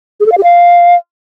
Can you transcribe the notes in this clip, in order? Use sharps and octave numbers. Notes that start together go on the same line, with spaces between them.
G#4
A4
F5
G4
F5